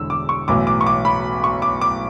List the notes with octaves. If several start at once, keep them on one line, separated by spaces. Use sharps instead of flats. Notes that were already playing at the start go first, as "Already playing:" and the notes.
Already playing: E1 E2 D3 E6
D6
C#6
B1 A2 E3 D6
D6
C#6
D6
B5
C#6
D6
D6